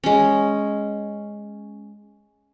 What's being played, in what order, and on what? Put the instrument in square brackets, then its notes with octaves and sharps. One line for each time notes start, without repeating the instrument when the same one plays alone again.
[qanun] G#3 C#4